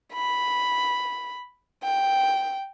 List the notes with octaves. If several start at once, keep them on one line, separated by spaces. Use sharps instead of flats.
B5
G5